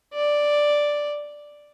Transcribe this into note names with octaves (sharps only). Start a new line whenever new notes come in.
D5